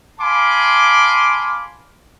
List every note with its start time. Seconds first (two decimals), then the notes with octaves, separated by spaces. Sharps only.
0.21 F5 G#5 A5 B5 C6 D6